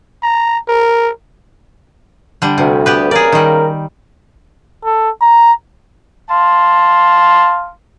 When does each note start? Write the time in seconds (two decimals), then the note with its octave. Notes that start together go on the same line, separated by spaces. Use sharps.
0.23 A#5
0.68 A#4
2.42 D3 G3
2.58 D2 C3
2.86 B3 G4 B4
3.11 C#3 A#3 G#4 A#4 D5
3.32 D#3 G3
4.84 A4
5.21 A#5
6.30 F5 A5 C6